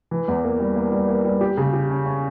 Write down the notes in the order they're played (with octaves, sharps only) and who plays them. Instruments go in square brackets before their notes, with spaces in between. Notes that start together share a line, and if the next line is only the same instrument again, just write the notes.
[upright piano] E3
E2
A#3
G3
A#3
G3
A#3
G3
G4
C#3
G4
C#4
C#4